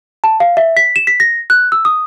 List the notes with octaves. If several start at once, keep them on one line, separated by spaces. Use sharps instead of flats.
A5
F5
E5
B6
E7
B6
A#6
F#6
E6
D#6